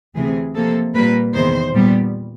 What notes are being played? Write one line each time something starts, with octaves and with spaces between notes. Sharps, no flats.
D2 C3 E3 A3 G#4
C3 F3 A#3 A4
A#2 G3 A#3 B4
E2 C3 D#3 C5
A#2 G3 B3